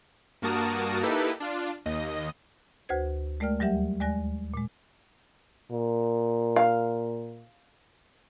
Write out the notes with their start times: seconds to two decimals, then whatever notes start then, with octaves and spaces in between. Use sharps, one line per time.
0.42 G2 A#3 F#4 A#4 A5 D#6
1.02 A#3 D#4 E4 G4 A4 B4
1.40 D4 F4
1.86 D#2 D#5
2.89 D2 F#4 B4 C5 G#6
3.40 G#3 A3 A#4 D5 G5 F6
3.59 D#2 F#3 G3 G4 E5 F#5
4.00 D#2 G#3 D5 G#5 F#6 A#6
4.54 A#2 G#3
5.72 A#2
6.56 F5